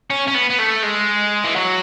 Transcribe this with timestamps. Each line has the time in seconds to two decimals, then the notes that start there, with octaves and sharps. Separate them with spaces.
0.10 C#4
0.28 C#4
0.34 B3
0.50 B3
0.59 A3
0.83 G#3
1.44 E3
1.56 F#3